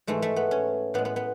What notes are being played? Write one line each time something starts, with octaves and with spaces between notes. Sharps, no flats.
G#2 E3 G#3 A3
A3
B3
C#4
A2 G#3 B3
B3
B3